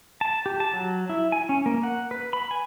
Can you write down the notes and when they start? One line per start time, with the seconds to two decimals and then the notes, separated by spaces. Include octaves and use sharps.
0.21 A5
0.46 G4
0.60 A5
0.73 F#3
1.09 E4
1.32 G#5
1.49 C#4
1.66 A#3
1.83 F#5
2.11 B4
2.33 B5
2.51 G#5